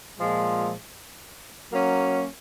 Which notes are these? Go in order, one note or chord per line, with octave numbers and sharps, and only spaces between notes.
A#2 F3 G#3
F#3 A#3 C#4